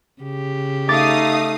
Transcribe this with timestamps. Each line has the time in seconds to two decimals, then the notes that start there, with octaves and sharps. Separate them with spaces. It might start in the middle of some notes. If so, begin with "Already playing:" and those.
0.22 C#3 G4
0.89 A3 D#4 F5 D6 D#6 A6